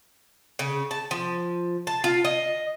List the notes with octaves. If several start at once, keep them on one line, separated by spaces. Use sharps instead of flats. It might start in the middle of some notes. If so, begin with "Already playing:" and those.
C#3
A5
F3
A5
F4
D#5